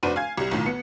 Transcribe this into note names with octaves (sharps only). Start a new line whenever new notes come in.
F1 D4 F#4 B4 C5 D#7
F5 G#5 G#6
C2 G3
B1 A2 D#3 F4
B3 C#7